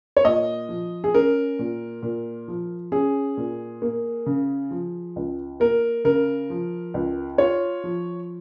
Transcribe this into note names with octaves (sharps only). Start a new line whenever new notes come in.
C#5
A#2 D#5
F3
G#4
C#4 A#4
A#2
A#2
F3
C#4 G#4
A#2
A#3
C#3
F3
C#2
A#3 A#4
C#3 A#4
F3
C#2
F4 C#5
F3